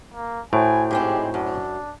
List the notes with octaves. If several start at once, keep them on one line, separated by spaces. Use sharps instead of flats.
A#3
A2 E4 F#4 C5 G#5
G#2 G#3 C4 G4
F#2 D4